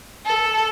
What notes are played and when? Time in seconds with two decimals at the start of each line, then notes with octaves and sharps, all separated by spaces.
0.25 A4